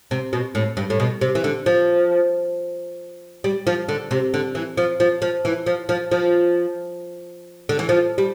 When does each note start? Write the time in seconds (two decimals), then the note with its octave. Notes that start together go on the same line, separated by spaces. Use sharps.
0.11 C3
0.33 B2
0.55 A2
0.77 G2
0.90 A2
1.00 B2
1.21 C3
1.35 E3
1.44 D3
1.66 F3
3.44 G3
3.67 F3
3.89 D3
4.11 C3
4.34 D3
4.55 E3
4.77 F3
5.00 F3
5.22 F3
5.45 E3
5.66 F3
5.89 F3
6.11 F3
7.69 D3
7.79 E3
7.89 F3
8.18 G3